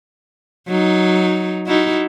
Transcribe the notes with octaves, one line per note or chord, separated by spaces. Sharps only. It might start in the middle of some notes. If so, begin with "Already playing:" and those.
F#3 D#4
D#4 E4 F#4